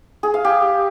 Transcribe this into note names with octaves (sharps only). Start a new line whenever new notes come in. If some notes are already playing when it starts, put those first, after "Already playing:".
G#4
F5
G4